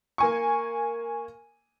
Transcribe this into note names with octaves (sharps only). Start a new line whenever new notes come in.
A#3 G#5 C#6